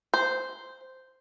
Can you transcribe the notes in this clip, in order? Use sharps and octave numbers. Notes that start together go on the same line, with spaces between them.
C5